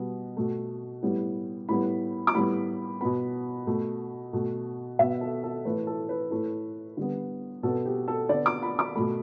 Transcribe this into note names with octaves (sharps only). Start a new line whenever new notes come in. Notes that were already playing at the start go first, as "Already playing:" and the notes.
Already playing: B2 G3 B3
B2 A3
A2 G3 B3
A2 G3 B3 B5
D6
A2 G3 B3 B5
B2 B3 B5
B2 A3
B2 A3
B2 B3 E5
A4
A4
A2 E3 A3 B4
A4
B4
A2 A3
D3 G3 B3
B2 B3 A4
G4
A4
D3 B3 D5
D6
B5
D6
B2 A3 B5